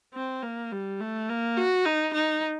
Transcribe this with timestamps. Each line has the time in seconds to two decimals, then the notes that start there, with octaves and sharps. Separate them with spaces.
0.14 C4
0.43 A#3
0.72 G3
1.01 A3
1.29 A#3
1.57 F#4
1.86 D#4
2.14 D#4